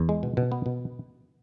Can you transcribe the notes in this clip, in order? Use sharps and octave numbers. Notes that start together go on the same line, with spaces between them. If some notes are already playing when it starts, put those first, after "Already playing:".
Already playing: E2
G#3
B2
B2
B3
B2